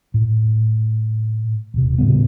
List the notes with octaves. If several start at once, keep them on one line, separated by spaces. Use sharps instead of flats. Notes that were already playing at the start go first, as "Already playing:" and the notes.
A2
D#1 C3
A2 C#3 G3 B3